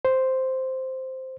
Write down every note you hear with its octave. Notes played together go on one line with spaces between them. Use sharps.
C5